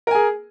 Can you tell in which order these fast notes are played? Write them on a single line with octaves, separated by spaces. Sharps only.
A#4 G#5 G#4